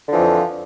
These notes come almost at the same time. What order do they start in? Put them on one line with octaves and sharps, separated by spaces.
D3 F3 E3 F2